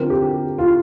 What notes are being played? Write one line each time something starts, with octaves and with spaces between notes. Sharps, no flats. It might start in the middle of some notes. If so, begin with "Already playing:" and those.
Already playing: D3 F3 C4 A#4
G4
F4